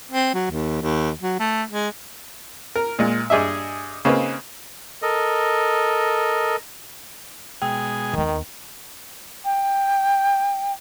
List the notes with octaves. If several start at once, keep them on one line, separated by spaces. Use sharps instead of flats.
C4
F#3
D#2
D#2
F#3
A3
G#3
A#4
A#2 G#3
G2 G#4 D#5 E5
C#3 A#3 C4 D#4 B4
A4 A#4 D#5
B2 G#3 G#4 G5
D#2 D#3 B3
G5